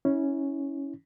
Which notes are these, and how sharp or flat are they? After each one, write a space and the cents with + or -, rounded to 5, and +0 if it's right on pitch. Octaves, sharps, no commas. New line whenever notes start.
C#4 +0 E4 -30